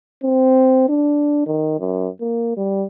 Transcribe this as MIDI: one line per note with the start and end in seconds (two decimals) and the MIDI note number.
0.24 0.86 60
0.89 1.45 62
1.46 1.75 51
1.79 2.08 42
2.21 2.56 58
2.57 2.85 55